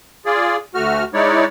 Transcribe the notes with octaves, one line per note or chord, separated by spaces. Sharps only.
F4 G#4 D5
D2 A3 F#4 F6
G#3 D#4 E4 C#5 D5